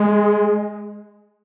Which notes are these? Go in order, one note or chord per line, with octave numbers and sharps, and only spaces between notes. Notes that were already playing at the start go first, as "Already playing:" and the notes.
Already playing: G#3